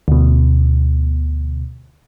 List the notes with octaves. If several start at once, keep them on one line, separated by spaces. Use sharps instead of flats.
D2 B2